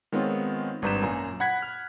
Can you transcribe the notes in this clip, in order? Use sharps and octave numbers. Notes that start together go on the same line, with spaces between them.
D#3 G#3 B3 C4 F4 C#5
G#1 G2 B4 A#5 G6 E7
F#2 A#2 G#5 A#5
F#5 B5 F#6 G#6 B6
F6